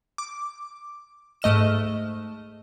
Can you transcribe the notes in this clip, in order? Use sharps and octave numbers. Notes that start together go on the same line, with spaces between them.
D6
G#2 A3 D#5 F6 E7